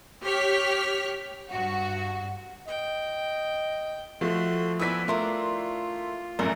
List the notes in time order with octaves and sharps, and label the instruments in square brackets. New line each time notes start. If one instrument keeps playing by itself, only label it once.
[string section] G4 C#5 F6 B6
G2 F#4
[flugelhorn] D#5 [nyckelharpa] G5
[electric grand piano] F3 [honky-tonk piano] A3 [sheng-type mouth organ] F#4 C6
[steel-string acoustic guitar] B3 D5 G5 [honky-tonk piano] E4 E6 B6 [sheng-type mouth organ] B4 G#5
[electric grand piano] A3 E5 C6 [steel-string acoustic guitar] D4 A#4 D5 [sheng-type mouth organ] F4
[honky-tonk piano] A#1 F#2 [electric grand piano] A3 [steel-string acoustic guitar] A#4